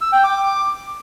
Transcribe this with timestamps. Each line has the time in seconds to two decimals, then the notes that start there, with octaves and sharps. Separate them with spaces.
0.01 E6
0.12 G5
0.24 D6